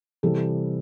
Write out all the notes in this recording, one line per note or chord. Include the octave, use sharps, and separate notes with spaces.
C3 E3 G3 A4